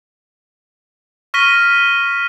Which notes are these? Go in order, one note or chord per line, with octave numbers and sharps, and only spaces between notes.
C#6 F6 A#6 B6 D#7 G7